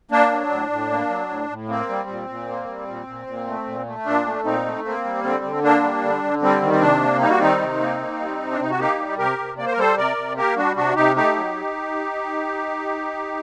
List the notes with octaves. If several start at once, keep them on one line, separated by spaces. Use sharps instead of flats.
A#3 D4
F#3
A2
A2
A#3
F#3
A2
A2
A#3 C4
G3
A#2
A#2
A#3
G3
A#2
A#2
A#2
A3
A#2
A3
A#2 D4
A3
A#2 C4 D#4
A3
A#3 C4
G3
D3 C4
D3
A#3 D4
G3
D3
D3
G3 C4
D#3
C4
C3 D4
A#3
G3 D#4
F#4
D#3 C4 D#4
C3
A#3
A#3
G3
C3
D4
C3 D#4
F#4
A#3 D#4 G4
G3
C3 G4 A#4
C3
A#3 D5
C5
A#4
G3 A4 C5
C3 A#4 D5
C3
A#3 G4 A#4
G3 D4 F#4
C3 D4 F#4
C3 D#4 G4
A3 D#4 G4
F#3